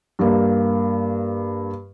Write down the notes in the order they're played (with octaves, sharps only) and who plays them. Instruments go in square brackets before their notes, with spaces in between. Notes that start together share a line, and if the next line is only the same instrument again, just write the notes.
[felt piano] G2 A#3